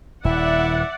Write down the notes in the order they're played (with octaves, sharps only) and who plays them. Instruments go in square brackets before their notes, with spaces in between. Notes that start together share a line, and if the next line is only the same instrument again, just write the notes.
[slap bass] D#1 [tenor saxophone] E4 [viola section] D5 F#5 [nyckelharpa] E5